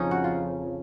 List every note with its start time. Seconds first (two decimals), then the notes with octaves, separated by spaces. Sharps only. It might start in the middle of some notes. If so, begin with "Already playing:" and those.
Already playing: F2 C#3 F3 C#4 D#4
0.11 F#4
0.24 F4